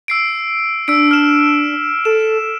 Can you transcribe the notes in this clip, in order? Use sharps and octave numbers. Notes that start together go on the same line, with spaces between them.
E6 C7 D7
D4 E6 B6 D7
F6 E7
A4 E7